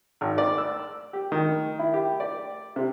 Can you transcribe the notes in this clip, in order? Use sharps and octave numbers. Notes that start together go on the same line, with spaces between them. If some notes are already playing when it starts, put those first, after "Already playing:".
G#1
D5
E6
G4
D#3
E4
G4
D5
C3